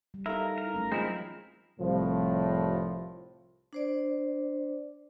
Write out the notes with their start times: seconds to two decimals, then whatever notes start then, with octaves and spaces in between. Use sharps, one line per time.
0.14 G3
0.26 D#4 E4 A4 A#4 F5
0.58 A#4
0.74 F#3 A3 C#4
0.92 E3 G#3 C4 E4 F4 A#4
1.80 C2 A2 F3
3.73 D4 C5 D5